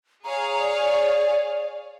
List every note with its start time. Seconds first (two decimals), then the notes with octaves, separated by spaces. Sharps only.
0.24 G#4 C#5 F5 A#5
0.59 D5